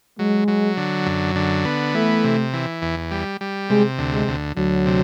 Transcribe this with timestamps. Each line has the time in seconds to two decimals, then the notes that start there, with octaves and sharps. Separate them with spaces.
0.19 F#3 G#3
0.48 F#3
0.77 D3
1.06 F#2
1.36 D3
1.65 B3
1.94 E3 A3
2.24 C3
2.53 E3
2.82 E2
3.11 G3
3.41 G3
3.70 C3 G#3
3.98 D2
4.13 G#3
4.28 D2
4.57 D2 F#3
4.86 C3